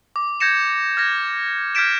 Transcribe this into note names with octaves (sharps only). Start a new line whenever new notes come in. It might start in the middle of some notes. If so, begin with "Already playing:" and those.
D6
G6 G#6 A#6 C#7 E7
F6 G#6 A#6
F6 G6 G#6 B6 D7 E7